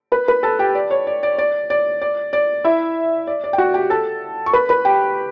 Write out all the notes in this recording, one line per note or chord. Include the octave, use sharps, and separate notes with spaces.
B4 B5
B4 B5
A4 A5
G4 G5
D5
C#5
D5
D5
D5
D5
D5
D5
E4 E5
D5
D5
G5
F#4 F#5
G4 G5
A4 A5
C#6
B4 B5
B4 B5
G4 G5